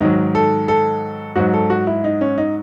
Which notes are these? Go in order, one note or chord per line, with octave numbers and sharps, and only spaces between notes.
G#2 D#3 F#3 D#4
A4
A4
G#2 F#3 F#4
A4
F#4
E4
D#4
C#4
D#4